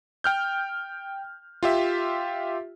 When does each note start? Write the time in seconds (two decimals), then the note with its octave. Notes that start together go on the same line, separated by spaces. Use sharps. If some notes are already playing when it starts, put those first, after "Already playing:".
0.24 G5 F6 G6
1.63 F4 G4 E5